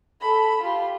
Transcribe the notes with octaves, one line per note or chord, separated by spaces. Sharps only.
A4 B5
F4 G4